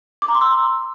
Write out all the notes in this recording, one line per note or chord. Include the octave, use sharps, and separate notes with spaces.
D6
A#5
C6
E6